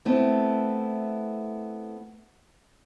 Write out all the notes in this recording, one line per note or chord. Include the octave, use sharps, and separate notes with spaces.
A3 B3 C4 E4